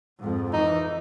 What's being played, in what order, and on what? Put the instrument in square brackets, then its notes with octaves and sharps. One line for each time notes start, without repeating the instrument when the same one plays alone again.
[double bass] F2 G#2
[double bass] E3 [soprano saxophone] D#4